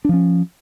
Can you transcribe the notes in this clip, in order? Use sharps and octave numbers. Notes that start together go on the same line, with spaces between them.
F3 C#4 D4